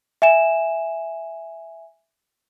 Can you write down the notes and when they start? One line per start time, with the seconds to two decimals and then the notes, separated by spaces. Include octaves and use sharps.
0.22 E5 G#5 E7